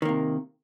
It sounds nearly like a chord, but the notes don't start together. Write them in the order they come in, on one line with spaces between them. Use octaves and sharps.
D#3 A#3 C3